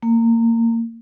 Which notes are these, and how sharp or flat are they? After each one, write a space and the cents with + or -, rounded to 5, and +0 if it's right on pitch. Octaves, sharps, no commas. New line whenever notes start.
A#3 -25